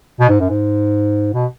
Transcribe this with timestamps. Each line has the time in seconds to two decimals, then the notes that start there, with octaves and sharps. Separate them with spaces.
0.20 B2
0.29 G#2
0.40 F#2
0.49 G#2
1.34 B2